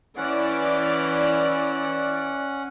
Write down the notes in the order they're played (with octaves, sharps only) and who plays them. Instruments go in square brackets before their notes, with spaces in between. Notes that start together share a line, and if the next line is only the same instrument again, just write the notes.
[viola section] E3 D5 [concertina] C#4 F#5